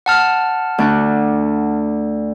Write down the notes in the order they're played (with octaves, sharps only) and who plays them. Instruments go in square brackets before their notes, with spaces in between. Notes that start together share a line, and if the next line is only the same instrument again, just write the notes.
[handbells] F#5 A5 F6
[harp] D2 D4 F#6